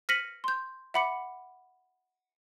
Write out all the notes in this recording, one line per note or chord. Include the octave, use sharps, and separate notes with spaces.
F6 A#6 B6 C#7 D#7 F#7
C6 G6
E5 F#5 B5 D6 C#7